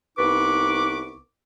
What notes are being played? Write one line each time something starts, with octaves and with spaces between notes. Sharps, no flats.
C2 B3 D#4 B4 C#6 D6